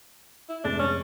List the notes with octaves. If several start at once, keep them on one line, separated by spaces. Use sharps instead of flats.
E4
F1 G#3 D4 A6
C#4